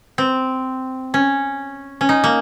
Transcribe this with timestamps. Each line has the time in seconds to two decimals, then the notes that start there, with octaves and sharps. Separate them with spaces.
0.18 C4
1.14 C#4
2.01 C#4
2.09 D#4
2.24 A#3